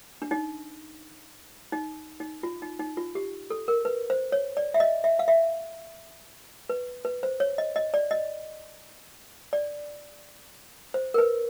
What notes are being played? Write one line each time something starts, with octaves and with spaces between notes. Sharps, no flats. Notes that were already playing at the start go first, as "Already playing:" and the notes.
D4
D#4
D#4
D#4
F4
D#4
D#4
F4
G4
A4
A#4
B4
C5
C#5
D5
E5
D#5
E5
F5
E5
B4
B4
C5
C#5
D#5
D#5
D5
D#5
D5
C5
A#4
B4